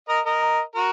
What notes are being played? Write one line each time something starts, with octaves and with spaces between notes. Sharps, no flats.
A#4 D#5
A#4 D#5
F#4 A#4